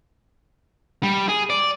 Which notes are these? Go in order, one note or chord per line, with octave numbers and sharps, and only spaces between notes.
G3
G#4
D5